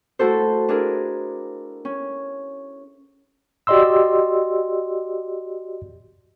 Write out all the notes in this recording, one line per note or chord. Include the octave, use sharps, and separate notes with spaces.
A3 E4 F#4 A4 C5
D4 E4 G#4 A#4
C#4
F#4 G4 D5 D#5 C6 E6